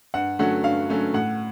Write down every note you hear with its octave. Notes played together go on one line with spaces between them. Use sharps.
G2 F#5
D3 F#3 A3 C#4 F#5
G2 F5
D3 F#3 A3 C#4
A2 F#5